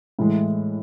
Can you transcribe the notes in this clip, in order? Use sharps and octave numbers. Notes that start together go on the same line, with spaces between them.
A2 E3 G#3